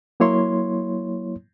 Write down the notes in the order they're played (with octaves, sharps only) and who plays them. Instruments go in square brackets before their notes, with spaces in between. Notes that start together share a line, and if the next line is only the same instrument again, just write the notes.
[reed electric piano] F#3 A#3 E4 C#5 C6